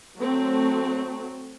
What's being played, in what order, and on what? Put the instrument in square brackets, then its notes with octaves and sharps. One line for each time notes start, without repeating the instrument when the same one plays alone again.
[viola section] F#3 A3 C4